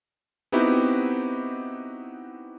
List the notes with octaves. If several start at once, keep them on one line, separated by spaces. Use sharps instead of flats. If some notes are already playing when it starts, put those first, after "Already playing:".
B3 C4 D#4 E4 F#4 G4